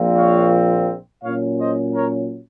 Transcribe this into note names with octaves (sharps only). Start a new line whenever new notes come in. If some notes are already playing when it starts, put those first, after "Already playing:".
Already playing: A#1 A#2 F3 C4
C#5 F5
A#2 F#3 C#4 C#5 F5
C5 D#5
A#4 C#5